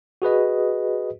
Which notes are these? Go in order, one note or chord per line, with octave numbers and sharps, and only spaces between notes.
F#4 G#4 B4 D#5